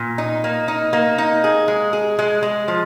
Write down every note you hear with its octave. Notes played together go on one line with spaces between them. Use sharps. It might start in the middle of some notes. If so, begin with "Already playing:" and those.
Already playing: A#2
D#4
A#3
D#4
A#3
D#4
G#4
G#3
G#4
G#3
G#3
F3